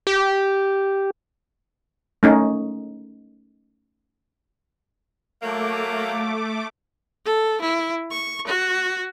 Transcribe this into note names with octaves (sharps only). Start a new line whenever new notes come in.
G4
A3 C#4 D#4
F#3 A3 A#3 D6
A4
E4
C#6
F#4